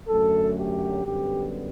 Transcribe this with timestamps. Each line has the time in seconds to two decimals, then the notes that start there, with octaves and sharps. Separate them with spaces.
0.08 F#2 D3 F#3 A3 A4
0.57 G4
1.04 F#2 D3 G3 B3 G4